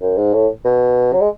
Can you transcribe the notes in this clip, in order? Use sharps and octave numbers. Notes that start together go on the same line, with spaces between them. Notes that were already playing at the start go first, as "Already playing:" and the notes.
F#2
G#2
A2
B2
F#3
G#3